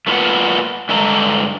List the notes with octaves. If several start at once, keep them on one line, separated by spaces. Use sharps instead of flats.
A3 A#3 F4 B4 F#5
G2 D3 G#3 A4 A5 A#5